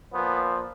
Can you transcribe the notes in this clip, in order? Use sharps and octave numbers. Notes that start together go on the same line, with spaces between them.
A#2 F3 B3